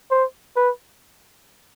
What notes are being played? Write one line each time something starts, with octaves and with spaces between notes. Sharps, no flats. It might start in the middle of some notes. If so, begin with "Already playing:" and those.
C5
B4